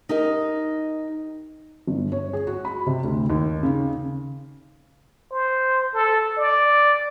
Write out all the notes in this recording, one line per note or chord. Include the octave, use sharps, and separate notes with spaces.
D#4 G4 A#4 D#5
G1
C#5
G#4
F#4
B5
C3
D2
D#2
C#3
C5
A4
D5